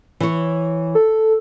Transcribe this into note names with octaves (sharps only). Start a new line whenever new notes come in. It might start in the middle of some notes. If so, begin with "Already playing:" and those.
E3 C#5
A4